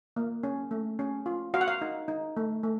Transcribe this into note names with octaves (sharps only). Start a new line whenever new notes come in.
A#3
C#4
A3
C#4
F4
F#4 F5
F#5
F5
D#4
D#4
A3
A3